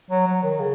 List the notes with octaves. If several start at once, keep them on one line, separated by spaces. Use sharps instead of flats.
F#3
F#3
D#3
C#3